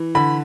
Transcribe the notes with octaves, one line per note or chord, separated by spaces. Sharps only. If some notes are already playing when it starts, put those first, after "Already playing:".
Already playing: E3
D3 B5